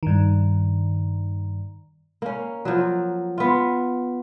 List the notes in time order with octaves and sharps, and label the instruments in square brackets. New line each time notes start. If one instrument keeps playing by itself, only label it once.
[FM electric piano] G2 D#3
[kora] A#3 C#4
F3 F#3
B3 F4